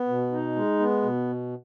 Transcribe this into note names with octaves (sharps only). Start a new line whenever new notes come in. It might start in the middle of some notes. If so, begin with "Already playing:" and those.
Already playing: B3
B2
D#4
G#3
B3
B2